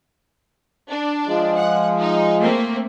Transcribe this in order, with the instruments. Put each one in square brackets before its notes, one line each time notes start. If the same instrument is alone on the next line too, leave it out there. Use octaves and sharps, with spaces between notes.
[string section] D4
[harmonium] F3 G#3
[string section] F#5
D#4
A3 A#3 C4